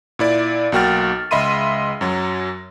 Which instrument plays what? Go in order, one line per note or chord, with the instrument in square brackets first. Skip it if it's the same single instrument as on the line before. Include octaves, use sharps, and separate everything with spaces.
[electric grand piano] A#2 E4 D5
B1 A#3 F#4 G5 F6 A6
C#2 D#5 E5 B5 C6 D#7
F#2 F#3